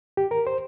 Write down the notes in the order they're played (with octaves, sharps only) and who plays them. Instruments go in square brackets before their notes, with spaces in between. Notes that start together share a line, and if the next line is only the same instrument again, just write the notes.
[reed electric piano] G4
A#4
C5